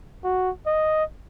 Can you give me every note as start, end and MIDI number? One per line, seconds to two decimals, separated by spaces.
0.24 0.50 66
0.66 1.04 75